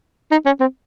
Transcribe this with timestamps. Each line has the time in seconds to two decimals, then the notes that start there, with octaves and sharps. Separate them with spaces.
0.31 D#4
0.46 C#4
0.61 C4